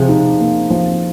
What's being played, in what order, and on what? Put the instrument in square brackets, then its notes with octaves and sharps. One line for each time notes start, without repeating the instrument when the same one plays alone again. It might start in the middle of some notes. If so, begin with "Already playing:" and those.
Already playing: [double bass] C3 [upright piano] F3 G#4
[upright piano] D#4
A#3
F3